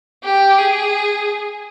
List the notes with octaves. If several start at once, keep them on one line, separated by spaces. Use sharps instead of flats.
G4
G#4